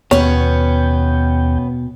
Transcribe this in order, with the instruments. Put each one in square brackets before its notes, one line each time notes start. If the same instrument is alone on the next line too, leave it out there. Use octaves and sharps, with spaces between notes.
[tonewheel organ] D#2 G5 [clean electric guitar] B2 [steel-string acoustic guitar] B3 C#4 [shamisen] C#5